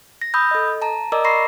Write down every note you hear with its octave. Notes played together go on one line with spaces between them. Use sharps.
A#6
B5 D#6 E6 G6
A4 D#5
A5 A#5
A#4 D5 D#5 A#5 D6 E6
A#5 B5 C#6 A#6 C7